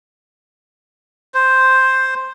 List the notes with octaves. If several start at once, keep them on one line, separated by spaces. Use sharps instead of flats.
C5